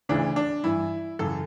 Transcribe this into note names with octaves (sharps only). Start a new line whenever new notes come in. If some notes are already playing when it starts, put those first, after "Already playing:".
D2 C#3 E3 D4
D4
G2 E3 E4
F#2 C#3 E3 A4